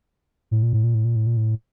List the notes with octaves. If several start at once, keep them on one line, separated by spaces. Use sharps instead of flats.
A2
A#2
A2
A#2
A2
A#2
A2
A#2
A2